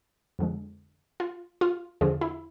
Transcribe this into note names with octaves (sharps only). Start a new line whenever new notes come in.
F2 D3 F3 G#3
F4
F4
E2 D3 F3 G#4
E4